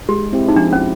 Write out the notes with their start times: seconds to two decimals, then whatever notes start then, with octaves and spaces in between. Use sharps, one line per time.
0.09 G#3 G4
0.33 C4 E4 G4
0.49 D#4
0.56 F3 D4
0.73 C#4